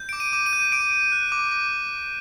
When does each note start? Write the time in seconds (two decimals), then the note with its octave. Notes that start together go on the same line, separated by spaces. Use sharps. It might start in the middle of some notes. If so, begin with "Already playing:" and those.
Already playing: G6
0.09 D6 D7
0.20 D#7
0.33 D6
0.46 D#7
0.53 G6
0.72 D6 D7
0.92 D6
1.12 F#6
1.32 D6
1.51 D6